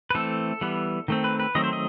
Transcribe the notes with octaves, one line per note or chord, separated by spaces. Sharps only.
B4
E3 A3 C4 A4
E3 G3 B3
D#3 A3 C4
B4
B4
D#3 F#3 A3 C4 D#5
C5
D#5